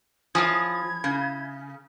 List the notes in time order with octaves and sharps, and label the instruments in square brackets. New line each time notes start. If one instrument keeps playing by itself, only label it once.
[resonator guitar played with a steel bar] F3 [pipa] C#4 G#4 [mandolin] E4 D#6 [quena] G#6
[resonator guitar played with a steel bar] C#3